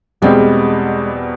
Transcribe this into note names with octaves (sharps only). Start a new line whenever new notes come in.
E2 B2 G3 G#3 C4